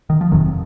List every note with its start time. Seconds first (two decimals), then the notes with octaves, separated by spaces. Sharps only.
0.10 D#3
0.21 F3
0.31 F1 F2 C3 D#3 F#3